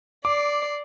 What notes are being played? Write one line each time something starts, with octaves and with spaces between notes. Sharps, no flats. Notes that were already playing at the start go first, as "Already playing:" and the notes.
D5 D6 C7